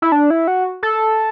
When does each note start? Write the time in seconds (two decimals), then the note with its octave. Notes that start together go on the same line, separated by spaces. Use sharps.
0.02 E4
0.12 D4
0.30 E4
0.48 F#4
0.83 A4